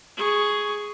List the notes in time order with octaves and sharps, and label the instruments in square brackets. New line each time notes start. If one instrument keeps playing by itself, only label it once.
[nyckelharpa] G#4 C#6